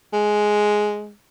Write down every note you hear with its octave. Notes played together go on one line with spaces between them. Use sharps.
G#3